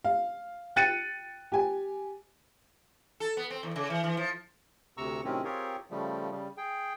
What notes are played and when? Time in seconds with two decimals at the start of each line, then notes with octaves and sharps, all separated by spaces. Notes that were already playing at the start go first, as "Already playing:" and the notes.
0.04 F5
0.76 G5 F#6 A6 C#7 D#7
1.52 G4 G#5
3.20 A4
3.37 B3
3.50 C4
3.63 E2
3.76 C#3
3.90 E3
4.04 E3
4.17 F3
4.97 D2 C3 A#5 C#6 E6
5.24 A2 C3 D#3 F#3 C4 C#4
5.44 C4 F4 G4 G#4 A#4 C#5
5.90 C#3 F3 G3 A3
6.31 C#3 G3
6.57 G#4 G5